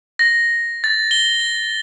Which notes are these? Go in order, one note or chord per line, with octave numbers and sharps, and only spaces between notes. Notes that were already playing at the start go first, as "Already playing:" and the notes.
A#6
A6
G7